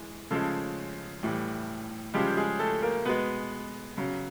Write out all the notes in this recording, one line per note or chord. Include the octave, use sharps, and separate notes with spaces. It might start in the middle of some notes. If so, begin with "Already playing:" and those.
Already playing: E3 G#3
C#3 F3 G#3 A3 A4
A2 E3 G3
C#3 F3 G3 G#3 G4
G#3 G#4
A3 A4
A#3 A#4
B2 G#3 B3 B4
C#3 F#3